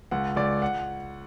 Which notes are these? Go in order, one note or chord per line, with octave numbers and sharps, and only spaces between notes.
C#2 F#5
C#2 D5
F#5